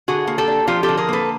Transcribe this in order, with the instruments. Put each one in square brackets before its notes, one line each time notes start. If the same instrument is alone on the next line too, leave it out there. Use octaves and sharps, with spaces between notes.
[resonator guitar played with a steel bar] D3 F#4 G#4
A#3
G4 A4
D4
F3 F4 G4
G4 A4
D3
G#4 A#4
A#3 A4 B4